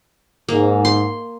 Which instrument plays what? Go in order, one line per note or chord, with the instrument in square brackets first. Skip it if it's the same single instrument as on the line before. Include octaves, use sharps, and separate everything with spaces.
[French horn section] G#2 [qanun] A#3
[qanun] C6